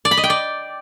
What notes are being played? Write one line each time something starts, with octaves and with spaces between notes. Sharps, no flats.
D5
B5
D#5
G5
D5